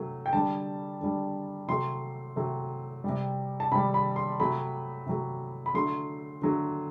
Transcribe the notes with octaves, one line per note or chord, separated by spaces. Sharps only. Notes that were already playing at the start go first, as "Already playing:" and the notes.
Already playing: C3 F#3 A3
G5
D3 G3 A5
D3 G3
C3 F#3 A3 C6
C3 F#3 A3
C3 G3
A5
C3 G3 B5
B5
C6
C3 F#3 A3 B5
C3 F#3 A3
B5
D3 F#3 A3 C6
D3 F#3 A3